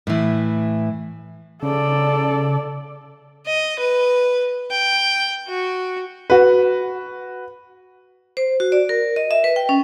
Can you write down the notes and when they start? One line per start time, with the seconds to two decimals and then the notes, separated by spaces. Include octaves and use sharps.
0.07 A2 E3
1.63 C#3 A4 D5
3.46 D#5
3.79 B4
4.70 G5
5.47 F#4
6.30 F#4 B4
8.37 C5
8.60 F#4
8.72 D5
8.89 A#4
9.16 D#5
9.31 E5
9.44 B4
9.56 G5
9.69 C#4